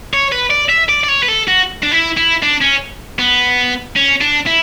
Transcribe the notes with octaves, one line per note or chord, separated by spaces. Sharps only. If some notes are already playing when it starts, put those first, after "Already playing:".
C#5
B4
D5
E5
D5
D5
C#5
B4
A4
F#4
D4
E4
E4
D4
C#4
B3
C#4
D4
E4